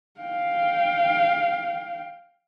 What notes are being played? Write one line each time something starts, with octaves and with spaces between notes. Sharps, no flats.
F5 G5